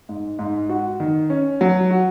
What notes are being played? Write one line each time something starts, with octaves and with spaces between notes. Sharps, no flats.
G#2
G#2
F#4
D#3
C#4
F#3
F#4